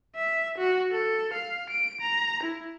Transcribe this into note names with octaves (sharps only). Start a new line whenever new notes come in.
E5
F#4
A4
F5
D7
A#5
E4